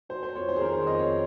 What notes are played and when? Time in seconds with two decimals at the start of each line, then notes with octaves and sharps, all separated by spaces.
0.09 F#3 C5
0.23 C5
0.36 F2 C#5
0.49 C5
0.56 G#4
0.61 D#3 A#4
0.73 C5
0.87 F2 D#5
0.99 C#5